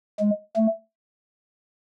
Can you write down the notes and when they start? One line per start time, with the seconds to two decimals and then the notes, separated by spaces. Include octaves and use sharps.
0.20 G#3
0.56 A3